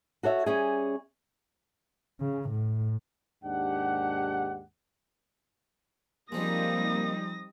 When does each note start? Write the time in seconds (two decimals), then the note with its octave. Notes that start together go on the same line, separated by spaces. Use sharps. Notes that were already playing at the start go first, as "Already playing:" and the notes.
0.23 F#4 A4 C#5 E5
0.46 G3 C#4 G#4
2.21 C#3
2.50 A2
3.44 D#2 G#2 D4 G4 F#5
6.32 F3 G3 G#3 A#3 C4 D#4 D#6 A#6